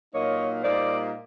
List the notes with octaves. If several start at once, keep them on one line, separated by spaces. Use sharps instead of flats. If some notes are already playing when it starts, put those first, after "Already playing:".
A#2 F#3 A#3 D#4 C#5 D#5
A#2 G3 A#3 D#4 C5 D5